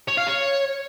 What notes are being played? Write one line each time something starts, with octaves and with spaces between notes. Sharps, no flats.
C#5
F5
C#5